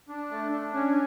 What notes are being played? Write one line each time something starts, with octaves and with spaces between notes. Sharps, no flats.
D4
A3
D4
C#4